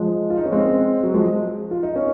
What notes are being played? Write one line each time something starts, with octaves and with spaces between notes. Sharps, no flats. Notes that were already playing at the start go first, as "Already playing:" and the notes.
Already playing: F3 G#3
F4
D#4
C#4
G#3 C4
F#3
F3 G#3
F4
D#4
C#4